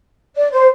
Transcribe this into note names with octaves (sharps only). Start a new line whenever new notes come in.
D5
C5